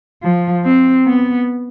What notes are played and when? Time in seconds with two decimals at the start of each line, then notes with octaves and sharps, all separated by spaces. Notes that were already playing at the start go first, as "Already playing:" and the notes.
0.23 F3
0.64 C4
1.06 B3